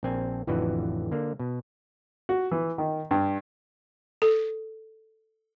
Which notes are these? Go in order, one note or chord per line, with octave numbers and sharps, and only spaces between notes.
A#1 C4 G#5
A1 F2 D3 E3 F#4 B4
D3 A#3
B2
F#4
E3
D#3
G2
A4